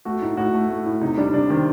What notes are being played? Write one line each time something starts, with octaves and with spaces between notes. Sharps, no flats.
A3 F#4
A2 D#4
A2 F#4
A3
A3
A2
C3 D#4
G3 D4
C3 D4
D#3 C4